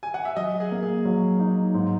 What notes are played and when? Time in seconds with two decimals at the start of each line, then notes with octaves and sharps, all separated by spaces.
0.03 G#5
0.14 F#5
0.25 E5
0.36 F#3 D#5
0.60 G#4
0.71 A#3
0.83 G#4
1.05 F#3
1.40 D#4
1.74 G#2